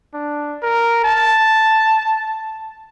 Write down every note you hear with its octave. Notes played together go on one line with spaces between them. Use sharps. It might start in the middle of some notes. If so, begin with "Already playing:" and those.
D4
A#4
A5